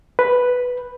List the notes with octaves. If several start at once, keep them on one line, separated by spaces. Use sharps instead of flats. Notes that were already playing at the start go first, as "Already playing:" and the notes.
B4